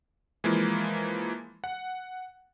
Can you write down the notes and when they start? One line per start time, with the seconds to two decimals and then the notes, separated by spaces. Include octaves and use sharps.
0.44 E3 F3 G#3 A#3
1.64 F#5